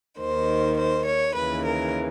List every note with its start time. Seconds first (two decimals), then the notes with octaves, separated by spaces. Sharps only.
0.18 D#2 D#3 C5
0.77 C5
1.06 C#5
1.35 D#2 C#3 E3 B4
1.65 A#4